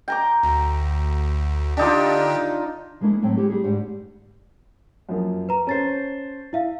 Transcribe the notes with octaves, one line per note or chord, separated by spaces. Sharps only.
G5 A#5 D6
D2
D3 D4 D#4 F4 G4
F3 G#3 A#3 D4 E4 A4
A2 F#3 A3 C4 C#5 G5
G#3 E4 F#4 G4 A4
G3 G#4
D2 G#2 D4 G4 D5 F#5
F#2 F3 A#3
B4 A#5
C#4 C5 A5 A6 C7
E4 E5 F5